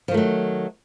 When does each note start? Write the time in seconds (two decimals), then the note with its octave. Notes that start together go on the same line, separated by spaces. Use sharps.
0.08 F3
0.11 D#3
0.14 A3
0.17 F#3